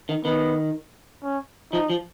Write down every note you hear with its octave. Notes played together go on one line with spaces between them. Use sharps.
D#3
D#3 B3
C#4
F3 D#4
F3